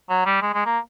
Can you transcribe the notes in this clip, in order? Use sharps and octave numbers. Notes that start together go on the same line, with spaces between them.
F#3
G3
G#3
G#3
A#3